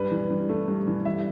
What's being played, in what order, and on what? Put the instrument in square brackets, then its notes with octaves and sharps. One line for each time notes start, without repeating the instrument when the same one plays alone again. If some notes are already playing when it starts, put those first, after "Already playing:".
Already playing: [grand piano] G2 G3 B4
E3
G2
A3
G2
E3
G3 E5